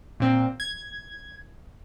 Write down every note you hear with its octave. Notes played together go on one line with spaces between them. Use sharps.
A#2 C4
G#6